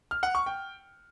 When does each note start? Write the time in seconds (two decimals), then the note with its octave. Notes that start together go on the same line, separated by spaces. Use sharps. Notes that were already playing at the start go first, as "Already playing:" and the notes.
0.11 F6
0.23 F#5
0.35 C#6
0.46 G5